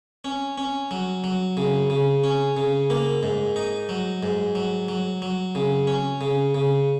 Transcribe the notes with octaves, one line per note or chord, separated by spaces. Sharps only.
C#4
C#4
F#3
F#3
C#3
C#3
C#4
C#3
A#3
G#2
D#4
F#3
G#2
F#3
F#3
F#3
C#3
C#4
C#3
C#3